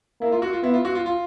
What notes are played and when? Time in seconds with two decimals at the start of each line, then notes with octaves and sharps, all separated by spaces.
0.21 A#3 E4
0.32 F4
0.42 F#4
0.53 F4
0.63 B3 E4
0.74 F4
0.85 F#4
0.95 F4
1.06 F4